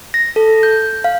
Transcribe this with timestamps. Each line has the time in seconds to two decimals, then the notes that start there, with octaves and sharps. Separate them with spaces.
0.14 A#6
0.36 A4
0.63 G6
1.04 F5